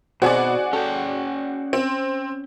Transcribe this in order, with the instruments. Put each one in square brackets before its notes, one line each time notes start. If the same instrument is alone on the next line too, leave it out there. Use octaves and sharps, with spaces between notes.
[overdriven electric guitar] B2 [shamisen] D#3 C4 C5 [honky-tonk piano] F#4 G#4 D5
[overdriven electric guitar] C#4 G5 [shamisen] A4
[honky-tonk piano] C4